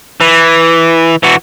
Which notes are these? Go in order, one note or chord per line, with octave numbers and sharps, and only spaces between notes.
E3
E3 F#4